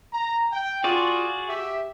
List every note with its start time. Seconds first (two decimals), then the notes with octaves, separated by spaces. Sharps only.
0.13 A#5
0.52 G5
0.84 F4 F#4 G#4 D5
1.49 G4 E5